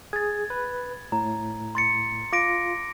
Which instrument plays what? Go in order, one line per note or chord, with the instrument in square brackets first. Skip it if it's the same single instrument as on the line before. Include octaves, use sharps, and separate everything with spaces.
[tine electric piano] G#4 [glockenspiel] G#6 A6
[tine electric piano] B4
[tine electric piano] A2 [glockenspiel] A#5
[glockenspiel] C6 A6 C#7
[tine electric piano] F4 [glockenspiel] D6 A#6 D7